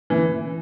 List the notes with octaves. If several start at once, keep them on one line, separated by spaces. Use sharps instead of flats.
D3 E3 A#3 C#4 E4